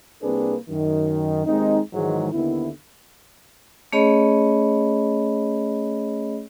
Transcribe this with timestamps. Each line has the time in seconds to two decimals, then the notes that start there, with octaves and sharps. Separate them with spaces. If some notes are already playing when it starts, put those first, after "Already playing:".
0.23 C2 A#3 C4 D4 G#4 B4
0.70 F#2 D#3
1.46 D#2 G#3 C4 D#4
1.94 G#2 D#3 E3 F#3 G#3
2.33 D#2 D3 B3 E4
3.92 A3 C#4 G#4 C#5 D#5 B5